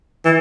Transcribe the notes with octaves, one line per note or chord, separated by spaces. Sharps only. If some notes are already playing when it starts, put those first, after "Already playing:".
E3